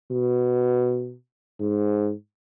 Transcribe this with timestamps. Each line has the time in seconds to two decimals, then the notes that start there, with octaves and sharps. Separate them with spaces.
0.12 B2
1.61 G#2